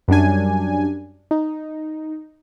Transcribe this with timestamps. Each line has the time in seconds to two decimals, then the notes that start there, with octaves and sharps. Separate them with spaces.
0.08 F#2 G3 D4 G#5
1.31 D#4